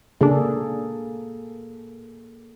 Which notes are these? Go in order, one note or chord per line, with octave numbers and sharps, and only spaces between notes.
C#3 A#3 D4 G#4 A4